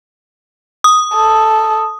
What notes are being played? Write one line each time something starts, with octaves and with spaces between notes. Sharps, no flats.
D#6
A4